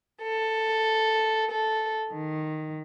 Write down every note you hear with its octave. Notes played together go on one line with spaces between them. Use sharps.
A4
A4
D#3